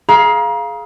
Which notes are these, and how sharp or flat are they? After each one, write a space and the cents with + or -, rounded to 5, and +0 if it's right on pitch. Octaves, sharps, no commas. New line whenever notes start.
G#4 +25 F5 +0 A#5 +35